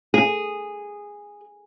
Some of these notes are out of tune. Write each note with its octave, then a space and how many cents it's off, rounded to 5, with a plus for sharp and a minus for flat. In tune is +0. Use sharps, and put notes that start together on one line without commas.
G#4 -10